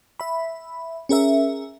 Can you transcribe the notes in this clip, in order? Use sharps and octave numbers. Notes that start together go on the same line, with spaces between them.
E5 B5
C#4 G#4 A#4 E5